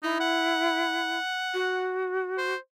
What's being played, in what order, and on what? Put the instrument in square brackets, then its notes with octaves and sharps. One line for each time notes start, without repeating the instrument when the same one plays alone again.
[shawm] D#4 [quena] E4
[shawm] F#5
[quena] F#4
[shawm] C5